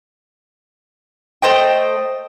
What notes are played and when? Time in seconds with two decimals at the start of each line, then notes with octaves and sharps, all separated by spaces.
1.42 A3 C5 D#5 G5